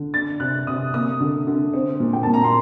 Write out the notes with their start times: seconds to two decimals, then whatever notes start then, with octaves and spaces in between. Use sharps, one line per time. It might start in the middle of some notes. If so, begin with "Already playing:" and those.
Already playing: D3
0.14 D4 A6
0.40 C3 F#6
0.67 C3 D#6
0.94 A#3 D#6
1.21 D3
1.47 D3
1.74 C4
2.00 A#2
2.13 G5
2.23 A#2 A5
2.34 A#5
2.44 C6